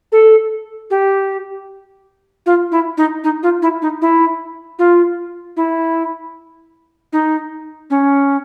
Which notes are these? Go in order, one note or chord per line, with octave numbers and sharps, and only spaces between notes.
A4
G4
F4
E4
D#4
D#4
F4
E4
D#4
E4
F4
E4
D#4
C#4